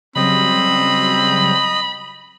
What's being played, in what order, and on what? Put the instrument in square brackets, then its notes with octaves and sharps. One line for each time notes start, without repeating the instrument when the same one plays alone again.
[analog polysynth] C#3 F#3 G3 [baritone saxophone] C4 [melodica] D#5 [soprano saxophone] B5